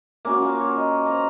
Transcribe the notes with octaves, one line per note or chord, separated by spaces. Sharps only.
A#3 C#4 F#4
F4
C#5
D#5
C5 A#5